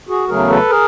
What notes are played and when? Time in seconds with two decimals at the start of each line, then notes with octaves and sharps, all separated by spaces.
0.09 F#4 G#4
0.29 E2 C#3 F#3 A3 G#4 A#4
0.49 A4 B4
0.70 G#4 A#4